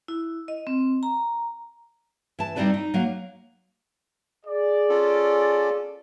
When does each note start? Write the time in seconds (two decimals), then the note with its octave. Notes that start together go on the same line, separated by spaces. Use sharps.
0.08 E4
0.48 D#5
0.67 C4
1.03 A#5
2.39 E3 A5
2.56 G3 C4 D#4 E4 B4 D5
2.74 D#4
2.94 F#3 A#3
4.46 G#4 D5
4.89 C#4 F4 A4